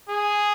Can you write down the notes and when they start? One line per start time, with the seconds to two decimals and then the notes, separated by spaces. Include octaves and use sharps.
0.09 G#4